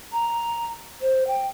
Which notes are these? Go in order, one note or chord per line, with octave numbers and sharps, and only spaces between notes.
A#5
C5
G5